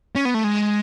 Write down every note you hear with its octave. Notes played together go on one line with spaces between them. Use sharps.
C#4
B3
A3
G#3